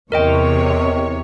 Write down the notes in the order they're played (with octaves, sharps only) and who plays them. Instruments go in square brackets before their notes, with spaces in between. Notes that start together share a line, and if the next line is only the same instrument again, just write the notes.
[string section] E2 C3 C#5 [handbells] A#4 D#5 G5